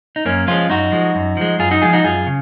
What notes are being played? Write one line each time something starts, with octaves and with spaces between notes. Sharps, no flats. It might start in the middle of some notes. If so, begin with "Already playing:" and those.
D#4
F#2 A#3 C#4
F3 G#3 C#4 F4
F#2 D#4 F#4
F3 G#3
F#2
F3 G#3
F#2 F4 G#4
D#4 F#4
F3 G#3 F4 G#4
D#4 F#4
F#2 F4 G#4
C#3